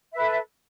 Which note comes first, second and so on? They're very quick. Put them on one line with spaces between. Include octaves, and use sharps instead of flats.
E5 B4 A4